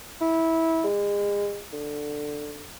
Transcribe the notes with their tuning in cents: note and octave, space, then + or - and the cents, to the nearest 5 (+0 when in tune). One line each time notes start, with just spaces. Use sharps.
E4 -15
G#3 -35
D3 +10